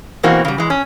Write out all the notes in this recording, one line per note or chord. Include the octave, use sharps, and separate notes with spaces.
B2 E3 A#3 C4 F#4
C#3 G3
E3 G#3
C#4